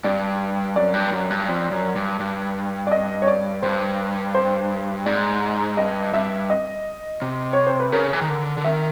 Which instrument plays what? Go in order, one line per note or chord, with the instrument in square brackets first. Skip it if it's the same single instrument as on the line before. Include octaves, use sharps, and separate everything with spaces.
[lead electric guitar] G2 [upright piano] D5
[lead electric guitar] F#2 [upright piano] D5
[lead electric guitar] G2
F#2
G2
F2
F#2
G2
G2
[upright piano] D5
D#5
C#5
D5
[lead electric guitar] G2 [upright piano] C5
[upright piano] C5
[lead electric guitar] G#2 [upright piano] D5
[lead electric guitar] G2 [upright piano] D#5
[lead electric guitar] G2 [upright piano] E5
[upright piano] D#5
[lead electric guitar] C3
[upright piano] C#5
C5
B4
[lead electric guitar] C#3 [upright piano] A#4
[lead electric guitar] E3
D#3
D3
D3
[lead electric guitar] D#3 [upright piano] E5